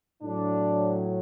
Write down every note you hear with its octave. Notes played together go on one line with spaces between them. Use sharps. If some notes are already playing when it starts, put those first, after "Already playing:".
A2 F#3 D4